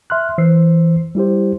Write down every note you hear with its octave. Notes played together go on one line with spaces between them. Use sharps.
E5 C6 F6 F#6
E3 C5 E6 C7
G3 E4 G4 C5